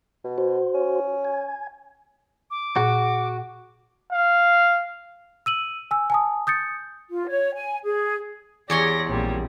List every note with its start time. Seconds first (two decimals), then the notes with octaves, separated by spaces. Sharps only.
0.24 B2
0.38 F#4 C5
0.74 C#4
1.25 G#5
2.51 D6
2.76 A#2 F#4
4.13 F5
5.46 E6 D#7 F#7
5.91 G#5 E6
6.10 G#5 A5 D#6
6.47 D#6 G6 A6 C#7
7.10 F4
7.28 C#5
7.54 G#5
7.84 G#4
8.70 E2 G4 C#5 D5 C6 A#6
9.08 A#1 A#2 G3 C4